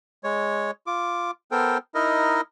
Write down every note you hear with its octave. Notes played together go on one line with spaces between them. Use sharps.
G#3 C#5
F4 D6
B3 A4 A#4 C5 G5
D#4 E4 A#4 D#5